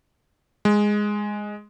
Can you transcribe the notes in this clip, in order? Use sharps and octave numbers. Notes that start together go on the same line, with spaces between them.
G#3